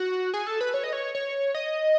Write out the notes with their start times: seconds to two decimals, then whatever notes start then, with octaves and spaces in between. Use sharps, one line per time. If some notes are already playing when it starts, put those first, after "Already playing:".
Already playing: F#4
0.34 G#4
0.47 A4
0.61 B4
0.74 C#5
0.84 D#5
0.93 C#5
1.15 C#5
1.55 D#5